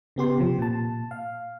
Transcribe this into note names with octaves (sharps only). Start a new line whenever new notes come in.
C#3 B3 G4 C6
C3 F3
A#2 A5
F5